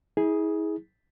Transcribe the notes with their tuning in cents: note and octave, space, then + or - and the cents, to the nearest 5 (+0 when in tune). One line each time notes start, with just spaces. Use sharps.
E4 -40 G#4 +0